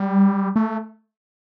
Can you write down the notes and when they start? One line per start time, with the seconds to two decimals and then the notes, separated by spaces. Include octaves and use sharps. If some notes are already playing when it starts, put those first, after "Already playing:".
Already playing: G3
0.56 A3